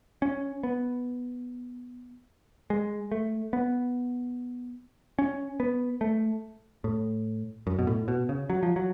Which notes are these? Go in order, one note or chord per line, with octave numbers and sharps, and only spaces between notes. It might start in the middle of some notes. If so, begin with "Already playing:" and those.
C#4
B3
G#3
A3
B3
C#4
B3
A3
A2
F#2
B2
A2
B2
C#3
F#3
F3
F#3